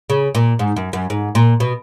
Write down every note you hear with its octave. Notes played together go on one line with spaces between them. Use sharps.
C#3
A#2
G#2
F#2
F#2
G#2
A#2
B2